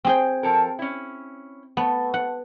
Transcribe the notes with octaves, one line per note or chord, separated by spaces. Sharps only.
C4 G#4 G5
F3 A4 A#4
C#4 E4
A3 B3
F#5